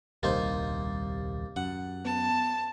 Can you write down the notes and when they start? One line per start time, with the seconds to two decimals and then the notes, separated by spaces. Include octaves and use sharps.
0.23 D#1 C2 A#3 D#4 G4 C5 A6
1.56 F#2 F#5
2.05 B3 A5